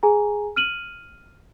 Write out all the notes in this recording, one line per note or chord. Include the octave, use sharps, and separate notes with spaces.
G#4 G#5 A#5
F6 D#7 F#7